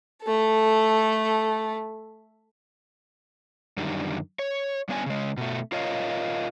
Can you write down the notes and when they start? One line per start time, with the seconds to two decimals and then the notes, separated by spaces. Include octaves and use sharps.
0.23 A3 A4
3.77 F#2 D3 D#3 G3
4.39 C#5
4.89 G3 B3 C#4 D4 F#5 G#5
5.06 C#3 G#3
5.37 B2 A3
5.72 F4 A#4 C#5 D#5 F5